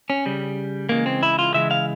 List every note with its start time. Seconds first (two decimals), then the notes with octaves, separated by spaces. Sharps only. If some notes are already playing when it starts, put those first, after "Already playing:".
0.10 C#4
0.26 C#3 G3
0.89 C#3 E3 G#3 A#3
1.06 C4
1.23 E4
1.39 F4
1.54 C#3 E3 G#3 E5
1.71 F5